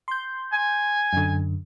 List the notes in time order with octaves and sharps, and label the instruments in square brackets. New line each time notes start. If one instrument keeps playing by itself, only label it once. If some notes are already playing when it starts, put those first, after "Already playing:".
[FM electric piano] C6 G6
[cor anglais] G#5
[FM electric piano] F#2 D3